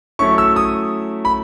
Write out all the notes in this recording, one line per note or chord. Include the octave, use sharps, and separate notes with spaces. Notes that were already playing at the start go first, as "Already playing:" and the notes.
F#3 A3 C#4 E4 C#6
E6
D#6
B5